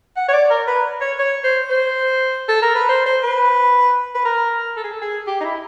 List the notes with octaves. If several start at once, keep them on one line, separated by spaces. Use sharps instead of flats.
F#5
C#5
D5
A#4
B4
C#5
C#5
C5
C5
A4
A#4
B4
C5
C5
B4
B4
A#4
A4
G#4
A4
G#4
G4
D#4
E4